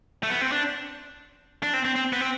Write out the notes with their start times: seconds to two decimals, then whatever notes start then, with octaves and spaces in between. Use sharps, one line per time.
0.23 A3
0.30 B3
0.41 C4
0.52 D4
1.63 D4
1.74 C4
1.85 C4
1.96 C4
2.13 B3
2.21 C4